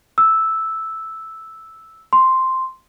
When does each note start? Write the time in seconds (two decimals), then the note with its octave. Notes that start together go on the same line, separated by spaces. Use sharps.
0.18 E6
2.13 C6